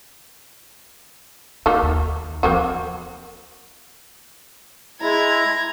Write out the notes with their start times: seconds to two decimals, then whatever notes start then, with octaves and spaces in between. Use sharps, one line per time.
1.66 D3 A#3 D#4 F#4
1.83 D#2
2.43 E3 F3 A#3 C4 F#4
5.02 G#3 E4 A#5 G#6